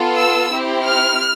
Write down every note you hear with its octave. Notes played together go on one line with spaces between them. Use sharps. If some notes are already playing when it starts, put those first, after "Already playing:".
Already playing: B3 F4 A4
E6
C4 E4 G4
F6